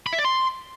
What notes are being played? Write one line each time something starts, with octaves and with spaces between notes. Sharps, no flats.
B5
E5
D5
C6